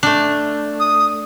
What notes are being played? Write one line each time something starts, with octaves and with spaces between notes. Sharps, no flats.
A3 D4
D#6